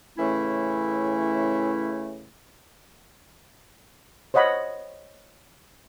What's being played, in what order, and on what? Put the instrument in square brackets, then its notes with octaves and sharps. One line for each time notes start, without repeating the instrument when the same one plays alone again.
[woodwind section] A2 C#3 E3 A3 C#4 E4
[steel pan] C5 C#5 D#5 F#5 B5